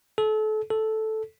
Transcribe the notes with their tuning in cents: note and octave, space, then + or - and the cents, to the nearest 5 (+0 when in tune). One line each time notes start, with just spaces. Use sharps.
A4 -30
A4 -5